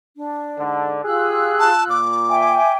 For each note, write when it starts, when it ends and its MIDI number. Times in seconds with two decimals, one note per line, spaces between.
0.16 0.88 62
0.59 1.01 44
0.59 1.01 50
1.05 1.98 65
1.05 1.69 67
1.05 1.69 68
1.05 1.98 88
1.05 1.98 90
1.59 1.84 81
1.90 2.57 46
1.90 2.77 86
2.30 2.78 76
2.30 2.78 79
2.30 2.78 80